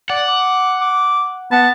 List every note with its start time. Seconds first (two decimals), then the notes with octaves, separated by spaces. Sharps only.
0.10 D5 F#5
0.28 D6
0.81 D6
1.52 B3 A5